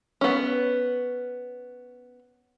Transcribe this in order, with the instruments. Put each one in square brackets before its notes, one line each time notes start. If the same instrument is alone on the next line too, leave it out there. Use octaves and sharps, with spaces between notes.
[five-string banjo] B3 C#4